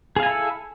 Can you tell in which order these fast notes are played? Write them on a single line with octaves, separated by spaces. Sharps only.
G#4 F5 G#5 E4 A4